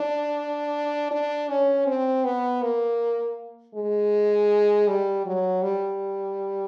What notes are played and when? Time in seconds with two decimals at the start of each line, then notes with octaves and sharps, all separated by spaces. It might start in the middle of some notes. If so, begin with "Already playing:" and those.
Already playing: D4
1.11 D4
1.49 C#4
1.87 C4
2.25 B3
2.62 A#3
3.75 G#3
4.88 G3
5.26 F#3
5.63 G3